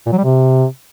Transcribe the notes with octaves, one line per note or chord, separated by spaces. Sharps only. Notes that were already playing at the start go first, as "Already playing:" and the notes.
A#2
F#3
G3
C3